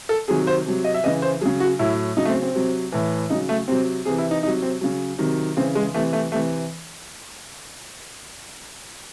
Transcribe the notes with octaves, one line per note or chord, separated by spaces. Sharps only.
A4
C3 D#3 F#3 G#4
C5
C3 F#3
D#5
E5
C#3 E3 D#5
C5
C#3 F#3 G#4
F#4
A2 F#3 E4
C#3 F#3 D#4
A3
C4
C4
C3 F#3
A2 E3
C#3 F#3 D#4
A3
C3 F#3 C4
C3 E3 G#4
E4
D#4
C3 F#3 D#4
C4
C#3 F#3
C3 D#3 F#3
C#3 E3 C4
G#3
C3 E3 A3
A3
C3 E3 A3